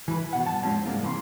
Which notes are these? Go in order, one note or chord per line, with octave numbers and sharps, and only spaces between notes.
E3 B4
B2 F#5
G2 A5
F2 A2 F3 G#3 C4 C#4
G2 C3 G#3 A#3 C4 F4
C3 E3 B5 C6